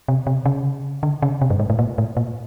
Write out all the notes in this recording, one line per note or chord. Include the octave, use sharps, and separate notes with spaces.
C3
C3
C#3
D3
C#3
C3
G2
G#2
A2
A#2
A2
A#2